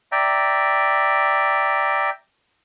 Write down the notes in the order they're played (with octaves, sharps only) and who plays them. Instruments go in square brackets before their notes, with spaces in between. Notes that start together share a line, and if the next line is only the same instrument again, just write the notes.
[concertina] D5 E5 G5 A#5